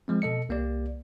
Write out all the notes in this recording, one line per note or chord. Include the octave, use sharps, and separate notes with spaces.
F3 G#3 C4
B2 A4 D#5 C#7
C2 A#3 G4 D5